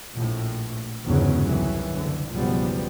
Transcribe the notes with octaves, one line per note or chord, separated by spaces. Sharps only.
A#1 A2
G1 E2 G#2 C#3 F#3
C2 D#3 E3 F#3
F#1 D3
F#1 B1 F3 G3 B3